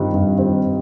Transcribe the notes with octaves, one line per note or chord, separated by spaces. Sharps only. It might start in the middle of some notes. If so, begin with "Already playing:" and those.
Already playing: G2 D#3 G3 C4
G2
D#3 G3 C4